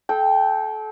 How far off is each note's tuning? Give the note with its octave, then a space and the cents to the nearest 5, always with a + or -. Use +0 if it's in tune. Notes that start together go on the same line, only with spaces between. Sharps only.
A4 -30 G5 +0